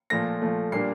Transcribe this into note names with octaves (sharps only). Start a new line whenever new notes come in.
A#2 F3 A3 A#6
A#2 F3 A3
A#2 G3 A#3 D4 C7